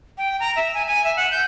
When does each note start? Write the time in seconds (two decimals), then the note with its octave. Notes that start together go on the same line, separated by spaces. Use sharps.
0.18 G5
0.40 A#5
0.56 E5
0.74 G#5
0.88 G#5
1.04 E5
1.17 F#5
1.31 G6